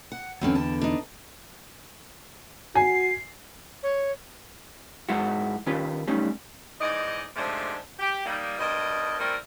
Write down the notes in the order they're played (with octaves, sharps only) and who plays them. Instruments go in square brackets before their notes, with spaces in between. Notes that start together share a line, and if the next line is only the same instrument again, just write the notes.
[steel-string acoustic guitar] F#5
[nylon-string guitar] E2 D3 [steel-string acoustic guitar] F#3 C4 C#4
[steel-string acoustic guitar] A5
D4 D#4
[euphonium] F#4 [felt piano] G#5 [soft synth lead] C7
[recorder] C#5
[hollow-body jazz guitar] G#2 G#3 E4 F#4
D#3 C#4 F4 G4 B4
G3 A3 C#4 D#4
[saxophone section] G#2 E3 D#4 D5 D#5
G#2 C3 F3 G#3 A3 D4
G4
G3 A#3 D#4
G2 B2 A#4 D#5
G3 A3 C4 E4 A#4